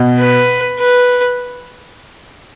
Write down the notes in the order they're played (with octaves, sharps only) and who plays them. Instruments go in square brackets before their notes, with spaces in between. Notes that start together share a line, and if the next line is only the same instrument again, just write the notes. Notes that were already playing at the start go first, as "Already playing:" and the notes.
Already playing: [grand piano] B2
[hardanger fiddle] B4
B4